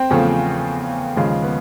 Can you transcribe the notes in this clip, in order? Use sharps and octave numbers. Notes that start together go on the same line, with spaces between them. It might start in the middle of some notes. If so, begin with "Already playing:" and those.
Already playing: C4
E2 C#3 F3 A3
D#2 C#3 F3 G#3
B3